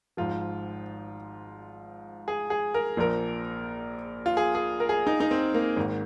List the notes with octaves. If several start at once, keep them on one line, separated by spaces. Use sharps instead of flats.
G#1 G#2 F3 F4
G#4
G#4
A#4
A#1 A#2 F3 A#4
F4
G#4
G#4
A#4
G#4
D#4
D#4
C4
A#3
G#1 G#2 D#3